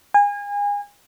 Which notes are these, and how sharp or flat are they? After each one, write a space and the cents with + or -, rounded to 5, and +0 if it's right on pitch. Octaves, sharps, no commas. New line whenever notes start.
G#5 -30